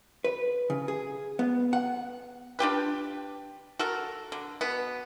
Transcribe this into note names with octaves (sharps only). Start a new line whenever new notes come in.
B4
C#3
G#4
B3
F#5
D4 F4 G4 B4
F#4 A4 A#4
D3
B2 B3